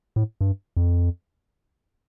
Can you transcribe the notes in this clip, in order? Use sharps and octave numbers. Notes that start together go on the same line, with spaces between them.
A2
G2
F2